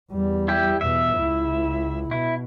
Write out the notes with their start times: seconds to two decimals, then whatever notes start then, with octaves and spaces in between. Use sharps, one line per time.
0.12 E2 G3
0.48 E4 G4
0.81 E2 B2 E5
1.16 C#2 E4
2.11 B2 E4